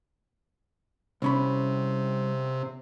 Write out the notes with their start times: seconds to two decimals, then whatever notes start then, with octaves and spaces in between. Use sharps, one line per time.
1.22 C2 C3 C#4 B5